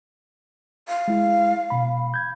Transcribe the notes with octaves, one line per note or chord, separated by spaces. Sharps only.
F5
G#3 E4
B2 B5
G6 G#6